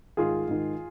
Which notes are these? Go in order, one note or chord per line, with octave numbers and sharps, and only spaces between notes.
G#2 D#3 F4 G#4
G#2 D#3